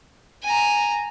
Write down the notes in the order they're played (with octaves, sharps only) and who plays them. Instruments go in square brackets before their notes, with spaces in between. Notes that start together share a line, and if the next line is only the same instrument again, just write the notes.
[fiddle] G#5 A#5